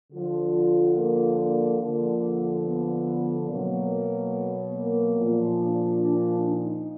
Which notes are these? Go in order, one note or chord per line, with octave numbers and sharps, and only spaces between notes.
D3 F3 F4
A#3
A#3
D3 F3 A#3
B3
B2 F#3 A#3
A#3
A#2 F3
D4
D4
D#4